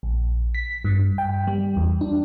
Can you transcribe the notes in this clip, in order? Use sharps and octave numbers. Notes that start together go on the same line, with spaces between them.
A#1
B6
G2
G5
G3
E2
D4